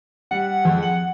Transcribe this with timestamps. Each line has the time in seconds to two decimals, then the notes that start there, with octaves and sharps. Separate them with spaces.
0.31 G3 F#5
0.65 F2 F3 G#3
0.83 F#7